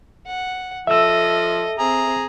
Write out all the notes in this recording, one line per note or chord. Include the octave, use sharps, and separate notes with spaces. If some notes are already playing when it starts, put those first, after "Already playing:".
F#5
F3 A4 D#5 E5 E6
C4 G#4 A#5